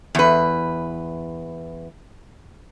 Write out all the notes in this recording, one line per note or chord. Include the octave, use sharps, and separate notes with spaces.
E2 B4